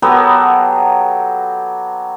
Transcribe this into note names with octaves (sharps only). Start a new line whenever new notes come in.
F#3 B3 G4 A4